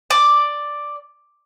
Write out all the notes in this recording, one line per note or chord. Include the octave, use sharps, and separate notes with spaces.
D5